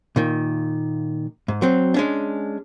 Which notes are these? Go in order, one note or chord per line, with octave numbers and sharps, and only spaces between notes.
A#2 D#3
G#2
F#3 C4
G#3 C#4 D4